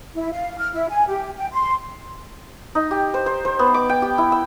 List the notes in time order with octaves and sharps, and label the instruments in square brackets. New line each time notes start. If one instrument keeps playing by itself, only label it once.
[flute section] E4
F5
F6
E4
G#5
G4
G5
C6
[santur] D#4
G4
C5
C5
C5
B3
D6
G5
G4
E4
E6